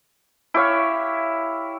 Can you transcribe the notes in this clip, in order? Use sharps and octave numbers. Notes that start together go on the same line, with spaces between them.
E4 G4 C#5 F5